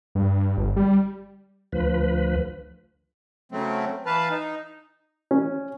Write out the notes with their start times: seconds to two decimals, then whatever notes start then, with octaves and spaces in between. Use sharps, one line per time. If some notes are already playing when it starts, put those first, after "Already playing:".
0.15 G2
0.58 G1
0.76 G3
1.72 D2 F3 B4
3.52 C#3 F#3 A3 C4
4.06 E3 B4 F5 A5
4.30 D#4
5.31 C#4